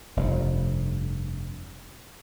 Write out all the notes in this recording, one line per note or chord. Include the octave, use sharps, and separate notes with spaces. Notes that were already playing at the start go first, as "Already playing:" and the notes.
F1 G2